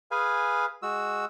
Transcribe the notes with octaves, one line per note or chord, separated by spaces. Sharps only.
G#4 B4 F5 G#5
G#3 F#4 E6